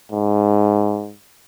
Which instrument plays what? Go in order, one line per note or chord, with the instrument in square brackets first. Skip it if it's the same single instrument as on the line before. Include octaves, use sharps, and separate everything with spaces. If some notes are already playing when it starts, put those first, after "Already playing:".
[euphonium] G#2